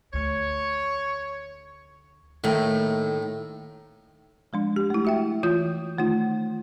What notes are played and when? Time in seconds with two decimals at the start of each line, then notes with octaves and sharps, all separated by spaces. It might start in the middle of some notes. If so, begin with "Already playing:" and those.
0.13 D2 C#5
2.44 A2 D#3 A3 A#3
4.53 F3 G#3 D4
4.76 G4
4.90 A3 E4
5.05 F#4 E5 G5
5.43 E3 F4 D#6 G6
5.98 D#3 A3 D#4 F4